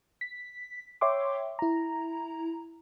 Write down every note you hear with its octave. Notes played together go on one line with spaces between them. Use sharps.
B6
C#5 E5 G5 C6 D6
E4 A#5